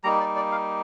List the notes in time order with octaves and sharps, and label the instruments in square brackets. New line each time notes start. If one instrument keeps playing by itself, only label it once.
[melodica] G3 A#3 D#4 A#5
D5
D5
F5